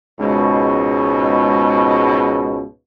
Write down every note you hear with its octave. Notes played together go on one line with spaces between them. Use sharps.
C#2 G#2 B2